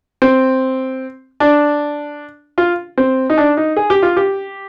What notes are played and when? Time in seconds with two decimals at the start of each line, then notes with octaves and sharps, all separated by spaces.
0.22 C4
1.40 D4
2.58 F4
2.98 C4
3.30 D#4
3.38 D4
3.57 D#4
3.77 G#4
3.90 G4
4.03 F4
4.17 G4